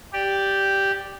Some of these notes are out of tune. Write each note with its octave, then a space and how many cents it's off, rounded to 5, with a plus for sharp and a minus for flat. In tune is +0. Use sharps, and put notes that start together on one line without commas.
G4 +0 D5 +0